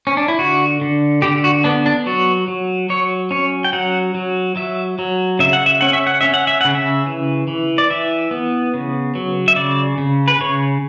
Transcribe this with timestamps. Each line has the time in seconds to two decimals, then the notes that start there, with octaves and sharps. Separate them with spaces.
0.07 C#4
0.17 D4
0.28 E4
0.39 D3 F#4
0.81 D3
1.22 D3 G4
1.44 F#4
1.64 B3 D4
1.86 D4
2.06 F#3 F#4
2.48 F#3
2.90 F#3 C#5
3.31 C#4 C#5
3.64 G5
3.73 F#3 F#5
4.15 F#3
4.56 F#3 E5
4.99 F#3
5.39 C#3 E5
5.53 F#5
5.66 E5
5.81 C#4 F#5
5.93 E5
6.07 F#5
6.21 C#4 E5
6.34 F#5
6.47 E5
6.61 C#3 F#5
6.75 E5
7.07 E3
7.48 E3
7.78 D5
7.90 E3 E5
8.31 B3
8.74 C#3
9.15 F#3
9.48 E5
9.56 C#3 D5
9.98 C#3
10.28 B4
10.41 C#3 C#5